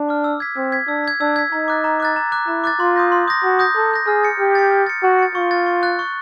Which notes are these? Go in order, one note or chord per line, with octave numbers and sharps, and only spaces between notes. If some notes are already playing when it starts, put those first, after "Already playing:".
Already playing: D4
D6 F6
E6
G#6 B6
C4 E6
G#6 B6
D4 E6
G#6 B6
D4 E6
G#6 B6
D#4 A#5
D6 F#6 A6
A#5
D6 F#6 A6
A#5
D6 F#6 A6
E4 A#5
D6 F#6 A6
F4 C6
D#6 G6 A#6
C6
D#6 G6 A#6
F#4 C6
D#6 G6 A#6
A4 C6
D#6 G6 A#6
G#4 F6
A6 C#7
G4 F6
A6 C#7
F6
A6 C#7
F#4 F6
A6 C#7
F4 C#6
F#6 A6
C#6
F#6 A6
C#6